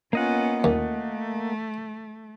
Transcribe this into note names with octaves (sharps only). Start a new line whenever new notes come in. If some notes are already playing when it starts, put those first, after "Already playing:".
A#3 B3 C#4 F4 D#5 F#5
D#2 A3